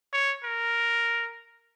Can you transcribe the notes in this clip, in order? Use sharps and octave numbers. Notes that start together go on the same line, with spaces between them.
C#5
A#4